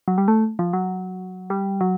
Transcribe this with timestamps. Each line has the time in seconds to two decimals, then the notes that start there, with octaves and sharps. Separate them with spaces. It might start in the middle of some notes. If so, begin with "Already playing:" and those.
0.08 F#3
0.18 G3
0.28 A3
0.59 F3
0.73 F#3
1.50 G3
1.81 F#3